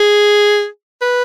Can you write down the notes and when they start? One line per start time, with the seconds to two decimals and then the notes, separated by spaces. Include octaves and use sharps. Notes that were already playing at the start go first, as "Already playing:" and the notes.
Already playing: G#4
1.02 B4